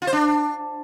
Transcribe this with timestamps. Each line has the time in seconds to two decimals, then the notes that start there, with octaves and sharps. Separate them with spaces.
0.02 F4
0.07 C5
0.13 D4